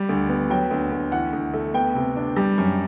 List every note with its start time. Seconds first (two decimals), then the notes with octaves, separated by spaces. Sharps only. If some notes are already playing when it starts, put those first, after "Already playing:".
Already playing: G3
0.09 D2
0.29 B3
0.50 F#3 G5
0.71 D2
0.91 D2
1.12 E3 F#5
1.33 D2
1.54 A3
1.74 B3 G5
1.95 C3
2.16 D4
2.36 G3
2.58 F#2